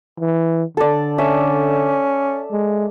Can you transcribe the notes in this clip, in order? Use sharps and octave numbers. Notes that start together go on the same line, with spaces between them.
E3
D3 A4 D5
C#4 E5
G#3